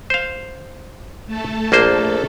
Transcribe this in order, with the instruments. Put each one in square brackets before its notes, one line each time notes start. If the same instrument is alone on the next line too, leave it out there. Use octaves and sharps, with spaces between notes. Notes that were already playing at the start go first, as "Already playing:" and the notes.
[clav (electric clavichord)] C5 F5
[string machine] A3 A4
[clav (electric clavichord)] A#1 A#3 C5